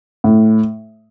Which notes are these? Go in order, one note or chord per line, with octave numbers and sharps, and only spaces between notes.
A2